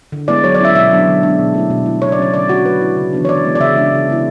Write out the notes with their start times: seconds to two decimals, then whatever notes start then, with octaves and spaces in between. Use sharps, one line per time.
0.12 D3
0.28 G#3 B3 E4 D5
0.44 F#3 C#5
0.54 D5
0.60 C#4 E4 E5
0.75 B2 E5
0.91 F#3 B3 D4
1.07 D3
1.23 G#3 D4
1.39 B2
1.54 A3 E4
1.70 B2
1.86 A3 E4
2.02 C#3 C#5
2.12 D5
2.18 F#3 C#4 C#5
2.34 D3 D5
2.49 A3 D4 F#4
2.65 F#3 B4
2.81 C#4 E4
2.97 C#3
3.13 E3 B3 D4
3.25 C#5
3.29 D3 D5
3.45 G#3 B3 E4
3.55 D5
3.60 C#3 E5
3.77 G#3 D4
3.92 C#3
4.08 G#3 B3 E4